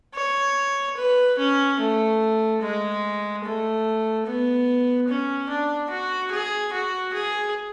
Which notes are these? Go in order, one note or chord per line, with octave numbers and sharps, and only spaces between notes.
C#5
B4
C#4
A3
G#3
A3
B3
C#4
D4
F#4
G#4
F#4
G#4